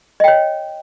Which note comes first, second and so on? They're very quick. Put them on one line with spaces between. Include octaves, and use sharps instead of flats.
D#5 G5 C#5